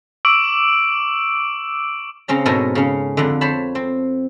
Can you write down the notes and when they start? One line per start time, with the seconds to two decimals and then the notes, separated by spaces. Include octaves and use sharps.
0.25 C#6 D6 E6 D7 F#7
2.28 C#3 C4 C#4 A#5
2.45 G#2 B2 A4 A#4 C#5 G#5
2.75 C#3 C#4
3.17 F2 D3
3.41 C5 C#5 A5 B5
3.75 C4